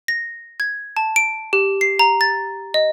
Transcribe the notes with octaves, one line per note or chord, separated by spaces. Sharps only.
A#6
G#6
A5
D7
G4
C7
A#5
A6
D#5